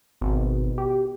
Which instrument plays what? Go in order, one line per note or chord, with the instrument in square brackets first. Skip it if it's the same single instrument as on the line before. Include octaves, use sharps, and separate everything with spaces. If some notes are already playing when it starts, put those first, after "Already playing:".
[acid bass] G#1 [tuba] B2
[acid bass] G4